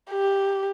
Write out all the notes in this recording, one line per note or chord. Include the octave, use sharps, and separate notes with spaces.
G4